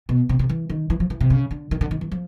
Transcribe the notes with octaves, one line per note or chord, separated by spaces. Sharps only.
B2
C3
C3
E3
D#3
E3
F3
E3
C3
C#3
D3
D#3
D3
D#3
E3
F3